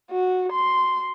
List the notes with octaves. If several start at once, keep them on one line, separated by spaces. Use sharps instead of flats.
F#4
C6